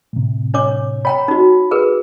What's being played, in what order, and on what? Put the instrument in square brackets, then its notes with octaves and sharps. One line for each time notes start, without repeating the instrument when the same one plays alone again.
[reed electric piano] A2 C3
[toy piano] D4 C#5 D6
[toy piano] C#5 G5 A#5 [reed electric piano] B5
[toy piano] D#4 F#4
G#4 A#4 B4